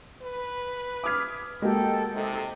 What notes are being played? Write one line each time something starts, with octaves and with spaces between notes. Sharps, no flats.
B4
D6 D#6 F6 G#6 B6
G#3 A#3 F#4 G4 A4 G5
C3 D#4 A4